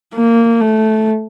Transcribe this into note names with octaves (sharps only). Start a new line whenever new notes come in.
A#3
A3